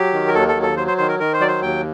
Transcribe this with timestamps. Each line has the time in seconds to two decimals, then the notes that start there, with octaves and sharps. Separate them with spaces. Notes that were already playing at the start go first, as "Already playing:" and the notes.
Already playing: F#3 G4
0.13 D#3
0.27 A#4
0.34 D#2 A4
0.48 A4
0.55 F#3
0.62 A4
0.77 F#3 C5
0.87 C5
0.97 D#3 C5
1.08 A#4
1.19 D#3 A#4
1.33 C5
1.40 F#3 D5
1.48 C5
1.61 D#2 G5